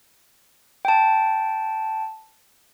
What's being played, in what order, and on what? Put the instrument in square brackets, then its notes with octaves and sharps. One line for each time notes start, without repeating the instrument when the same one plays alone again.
[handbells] G5 A5